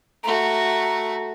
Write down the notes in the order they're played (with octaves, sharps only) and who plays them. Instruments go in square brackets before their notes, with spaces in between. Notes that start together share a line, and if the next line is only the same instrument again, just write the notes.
[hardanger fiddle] A3 F#4 [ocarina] A#5